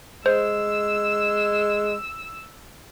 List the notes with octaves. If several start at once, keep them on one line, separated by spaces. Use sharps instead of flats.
G#3 C5 E6